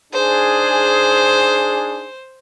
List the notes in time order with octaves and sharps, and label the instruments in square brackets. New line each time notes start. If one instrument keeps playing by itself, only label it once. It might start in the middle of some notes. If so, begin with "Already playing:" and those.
[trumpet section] D4 D#4 G#4 [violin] C5